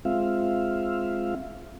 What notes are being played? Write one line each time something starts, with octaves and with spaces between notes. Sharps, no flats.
G#3 C4 F4 E5 F5